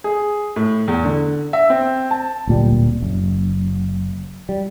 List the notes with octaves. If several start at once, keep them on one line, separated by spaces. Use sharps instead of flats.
G#4
A2
E2
D3
E5
C4
A5
D1 A#2 G3
F#1
G3